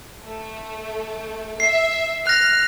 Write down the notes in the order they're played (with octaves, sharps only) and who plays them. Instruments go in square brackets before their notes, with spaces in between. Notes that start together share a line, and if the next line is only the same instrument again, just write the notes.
[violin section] A3
[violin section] E5 [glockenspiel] C7
[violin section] F6 [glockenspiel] F#6 A#6